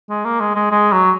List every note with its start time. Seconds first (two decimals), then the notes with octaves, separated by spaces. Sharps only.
0.09 G#3
0.25 A#3
0.40 G#3
0.55 G#3
0.71 G#3
0.92 F#3